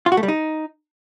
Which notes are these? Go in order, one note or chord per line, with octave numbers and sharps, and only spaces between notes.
F4
F#4
A3
G3
D#4